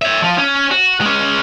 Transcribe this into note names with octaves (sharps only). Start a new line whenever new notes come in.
C#5 E5
F3 F4
C#4
F#4
G#3 C#4